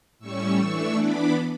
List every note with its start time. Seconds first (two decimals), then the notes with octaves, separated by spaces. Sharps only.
0.19 A2 G3 C#4 C#6 E6
0.58 E3 A3 D4 C#6 E6
0.96 E3 B3 D4 B5 D6